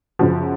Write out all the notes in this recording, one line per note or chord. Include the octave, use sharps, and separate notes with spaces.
F#2 C#3 F3 F#4